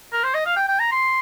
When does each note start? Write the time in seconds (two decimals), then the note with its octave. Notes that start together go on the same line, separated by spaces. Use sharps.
0.13 A#4
0.24 C5
0.34 D#5
0.46 F5
0.56 G5
0.68 G5
0.80 A#5
0.92 C6